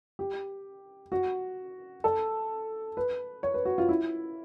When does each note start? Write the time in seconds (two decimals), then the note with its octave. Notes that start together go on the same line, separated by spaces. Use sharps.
0.19 G4
1.12 F#4
2.04 A4
2.97 B4
3.43 C#5
3.54 B4
3.65 F#4
3.78 F4
3.89 E4